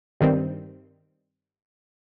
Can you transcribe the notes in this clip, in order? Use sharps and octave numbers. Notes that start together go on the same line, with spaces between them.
G2 D#3 G3 C4